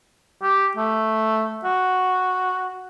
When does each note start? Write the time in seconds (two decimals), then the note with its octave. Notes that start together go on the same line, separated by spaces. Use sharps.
0.42 G4
0.76 A3
1.65 F#4